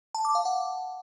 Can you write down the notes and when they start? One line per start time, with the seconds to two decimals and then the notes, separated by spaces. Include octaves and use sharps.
0.15 A5
0.25 D6
0.35 F5
0.45 F#5